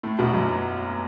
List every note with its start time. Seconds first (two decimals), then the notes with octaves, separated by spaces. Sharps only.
0.03 A2 A3
0.19 B1 B2
0.34 F#2